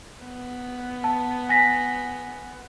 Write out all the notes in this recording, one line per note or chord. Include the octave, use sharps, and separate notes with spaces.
B3
A5
G#5 A#6 B6